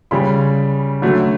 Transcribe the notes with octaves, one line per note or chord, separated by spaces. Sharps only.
C#3 G3 B5
D3 F#3 A3